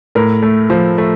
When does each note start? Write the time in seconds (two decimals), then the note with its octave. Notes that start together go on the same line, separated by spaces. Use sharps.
0.15 A2 A#4
0.42 A3
0.70 F3
0.98 A3